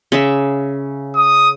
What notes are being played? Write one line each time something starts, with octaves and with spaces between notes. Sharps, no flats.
C#3 E5
D#6